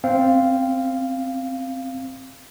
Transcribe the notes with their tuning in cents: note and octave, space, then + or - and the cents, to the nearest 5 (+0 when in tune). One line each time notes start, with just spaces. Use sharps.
C4 +0 F5 -10